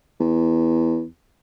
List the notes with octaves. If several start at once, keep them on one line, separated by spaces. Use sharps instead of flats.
E2